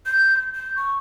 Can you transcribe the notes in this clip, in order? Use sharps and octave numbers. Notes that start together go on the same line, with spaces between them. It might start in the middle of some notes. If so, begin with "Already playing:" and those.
G6
G6
C#6